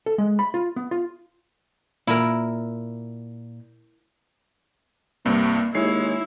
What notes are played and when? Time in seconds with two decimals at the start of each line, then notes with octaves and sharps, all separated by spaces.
0.06 A4
0.18 G#3
0.39 B5
0.54 F4
0.76 B3
0.91 F4
2.07 A#2 E4 A#4
5.25 C2 G2 A#3 C4
5.75 D#2 G#3 E4 C#5 C7